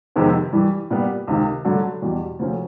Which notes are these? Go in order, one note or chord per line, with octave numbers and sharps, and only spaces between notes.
F2 C3 D#3 G#3 B3
G2 E3 G3
A#2 G3 B3
C#2 C3 D#3
G2 D3 F#3 A3
E2 B2 G3
D2 C3 F3 A3 C#4